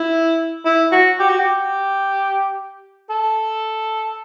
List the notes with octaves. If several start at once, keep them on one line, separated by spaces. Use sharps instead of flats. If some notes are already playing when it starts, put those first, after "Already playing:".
Already playing: E4
E4
F#4
G4
F#4
G4
A4